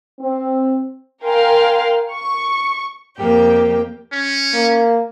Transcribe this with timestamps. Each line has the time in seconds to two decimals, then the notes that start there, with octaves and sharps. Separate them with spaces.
0.19 C4
1.24 A#4 F5 G5 G#5 C6
2.10 C#6
3.17 F2 A#3 G4 G5
4.12 C#4
4.53 A#3